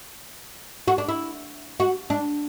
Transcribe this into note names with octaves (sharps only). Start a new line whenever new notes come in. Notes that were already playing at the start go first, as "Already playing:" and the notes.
F#4
D4
E4
F#4
D4